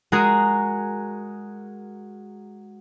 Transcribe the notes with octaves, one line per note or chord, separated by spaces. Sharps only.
G#3 F#4 G#4 A#4